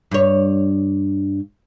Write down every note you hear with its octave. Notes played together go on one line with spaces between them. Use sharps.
G2 C#5